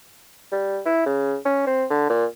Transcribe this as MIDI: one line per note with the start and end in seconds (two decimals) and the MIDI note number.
0.52 0.80 55
0.85 1.05 64
1.06 1.36 49
1.45 1.66 61
1.67 1.85 60
1.90 2.07 50
2.09 2.25 46